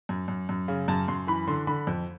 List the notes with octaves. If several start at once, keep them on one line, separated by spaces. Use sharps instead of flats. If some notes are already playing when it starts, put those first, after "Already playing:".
F#2
F#2
F#2
C#3
F#2 A5
F#2 C6
E3 B5
D3 C6
D3 B5
F2